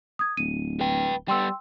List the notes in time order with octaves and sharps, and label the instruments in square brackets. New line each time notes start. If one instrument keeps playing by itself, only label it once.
[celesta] D#6 G#6
[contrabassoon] D1 [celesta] D#7
[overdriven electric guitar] B4 G5
[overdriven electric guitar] G3 B3 [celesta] G5 C6 E6